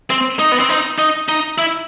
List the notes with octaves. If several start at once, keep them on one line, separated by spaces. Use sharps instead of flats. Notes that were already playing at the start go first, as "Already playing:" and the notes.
C4
D#4
B3
C4
D#4
D#4
D#4
E4